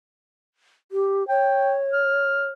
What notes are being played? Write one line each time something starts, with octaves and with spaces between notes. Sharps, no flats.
G4
C#5 G5
F6